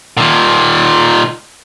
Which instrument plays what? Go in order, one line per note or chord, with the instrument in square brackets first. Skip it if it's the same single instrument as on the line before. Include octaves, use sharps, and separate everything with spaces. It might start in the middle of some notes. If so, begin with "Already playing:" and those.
[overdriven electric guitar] A#2 D#3